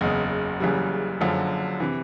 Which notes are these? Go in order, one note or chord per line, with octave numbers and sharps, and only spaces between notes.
F#1 E2 C#3 D#5
F#1 F#2 C#3 E3 G3
F#1 F#2 D3 F3
C3 E3